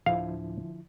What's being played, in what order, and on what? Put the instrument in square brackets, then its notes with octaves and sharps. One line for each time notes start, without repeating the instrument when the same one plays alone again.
[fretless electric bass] D1 D4 [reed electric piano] D3 F3 E4 [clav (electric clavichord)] F5